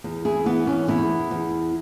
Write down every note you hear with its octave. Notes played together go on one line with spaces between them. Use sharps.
E2
E4 G#4
E3 B3
C#4
E2 B3 E4
E2